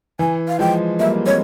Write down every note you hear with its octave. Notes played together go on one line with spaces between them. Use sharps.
E3 G#5
F5
F3 G#3 G5
G3 A#3 E5
G#3 C4 C#5